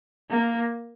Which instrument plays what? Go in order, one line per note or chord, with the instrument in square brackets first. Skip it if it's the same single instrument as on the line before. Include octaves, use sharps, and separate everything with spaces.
[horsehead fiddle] A#3